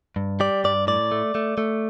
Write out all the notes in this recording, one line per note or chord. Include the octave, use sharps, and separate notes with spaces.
G2
G3 D5
G2 D5
A2 D5
A3
A3
A3